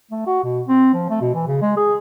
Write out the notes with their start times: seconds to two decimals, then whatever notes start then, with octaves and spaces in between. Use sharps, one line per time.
0.11 A3
0.27 F#4
0.44 B2
0.68 C4
0.94 F3
1.10 A3
1.21 B2
1.35 E3
1.47 C#3
1.62 G#3
1.77 G#4